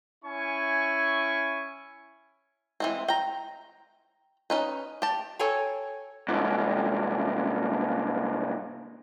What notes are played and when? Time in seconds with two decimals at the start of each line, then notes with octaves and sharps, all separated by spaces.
0.25 C#4 E4 G#5 C#6
2.80 E3 G#3 C4
3.08 G5 A#5
4.50 C#4 D#4 B4
5.02 G4 A5
5.39 A4 C#5 G5 G#5 A#5
6.28 C2 G#2